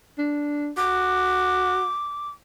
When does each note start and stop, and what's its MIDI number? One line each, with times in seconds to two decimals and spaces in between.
0.18 0.71 62
0.77 1.89 66
0.77 2.29 86